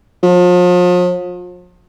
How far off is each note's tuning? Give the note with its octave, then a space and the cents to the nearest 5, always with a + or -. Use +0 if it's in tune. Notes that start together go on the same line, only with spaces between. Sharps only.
F3 +40